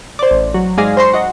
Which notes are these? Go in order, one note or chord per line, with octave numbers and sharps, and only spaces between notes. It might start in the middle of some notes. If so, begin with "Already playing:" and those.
C5 D5
A1
F#3
G#2 G#4 D5 F5 A#6
C5 A#5 C6 C#6
F#4 D#5